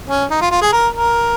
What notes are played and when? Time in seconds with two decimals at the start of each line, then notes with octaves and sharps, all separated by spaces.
0.09 C#4
0.31 D#4
0.41 F4
0.51 F4
0.61 G#4
0.73 A#4
0.94 A#4